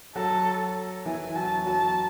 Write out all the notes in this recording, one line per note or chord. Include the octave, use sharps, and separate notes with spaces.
F#3 F#4 A4
E3 E4 G#5
F#3 F#4 A5
F#3 F#4 A5